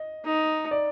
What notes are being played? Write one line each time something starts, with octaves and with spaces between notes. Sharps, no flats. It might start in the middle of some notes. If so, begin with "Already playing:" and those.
Already playing: D#5
D#4
D5